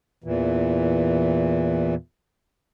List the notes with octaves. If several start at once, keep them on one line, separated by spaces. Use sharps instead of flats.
E2 A#2 E3